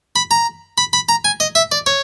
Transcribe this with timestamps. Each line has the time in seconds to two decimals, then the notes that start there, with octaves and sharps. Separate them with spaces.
0.16 B5
0.31 A#5
0.78 B5
0.93 B5
1.09 A#5
1.25 G#5
1.40 D#5
1.55 E5
1.72 D5
1.86 C#5